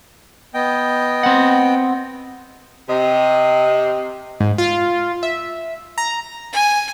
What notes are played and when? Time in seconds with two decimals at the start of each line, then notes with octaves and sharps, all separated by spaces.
0.54 B3 D#5 G5
1.23 C4 F#5
2.89 C3 D#5
4.40 G#2
4.58 F4
5.23 E5
5.98 A#5
6.53 G#5